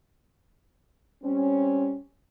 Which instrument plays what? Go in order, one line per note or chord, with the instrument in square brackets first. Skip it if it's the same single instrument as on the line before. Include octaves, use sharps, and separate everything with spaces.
[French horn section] G3 C4 C#4